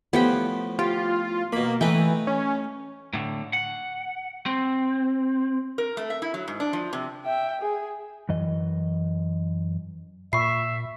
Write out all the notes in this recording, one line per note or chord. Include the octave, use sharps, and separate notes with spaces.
A2 F3 B3 G4 G5
F4 G4
B2 A#3 B5
E3 A3 D#4 B4 G5
C#4
A2 D3
F#5
C4
A#4
A3
E5
E4
F#3
G#2
D4
F3
C3
E5 G5
G#4
F#2 E3 D#5
A#2 E5 B5 C#6 C7